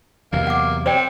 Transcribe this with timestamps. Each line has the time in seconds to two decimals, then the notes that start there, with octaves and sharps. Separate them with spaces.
0.33 E2 C3 F#3 A#3
0.47 F#5 D6
0.86 C4 C5 D5 G5